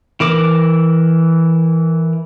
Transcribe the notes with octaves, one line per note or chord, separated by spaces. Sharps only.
E3 A#4 D6